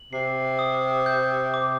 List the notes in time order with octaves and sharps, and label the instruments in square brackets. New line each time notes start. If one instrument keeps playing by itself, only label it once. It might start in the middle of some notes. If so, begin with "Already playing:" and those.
Already playing: [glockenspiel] F#7
[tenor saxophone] C3 [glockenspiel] C7
[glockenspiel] D#6
G6
D6